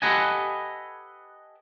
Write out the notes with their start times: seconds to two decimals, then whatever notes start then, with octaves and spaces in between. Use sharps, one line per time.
0.02 G4 A4 B4 D#5 F#5 G#5